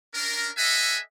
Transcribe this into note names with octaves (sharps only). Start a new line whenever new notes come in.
C#4 D4 A#4
A4 D#5 E5 F#5 G#5